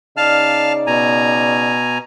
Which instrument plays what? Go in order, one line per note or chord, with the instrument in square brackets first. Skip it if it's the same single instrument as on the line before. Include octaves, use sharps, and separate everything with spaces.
[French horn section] C#3 D#4 D5 [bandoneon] F5 A5 F6
[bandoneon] B2 G#5 A#5